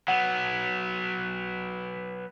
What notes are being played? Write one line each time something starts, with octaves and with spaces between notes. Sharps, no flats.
F#3 B3 F#5